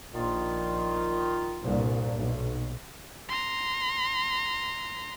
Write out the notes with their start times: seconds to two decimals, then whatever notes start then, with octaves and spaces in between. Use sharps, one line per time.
0.14 A#1 D#3 F4
1.63 C2 G2 A#2
2.15 B1
3.29 A#5 C6